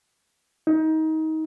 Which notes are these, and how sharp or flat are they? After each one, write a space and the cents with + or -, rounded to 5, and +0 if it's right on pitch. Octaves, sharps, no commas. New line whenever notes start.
D#4 +25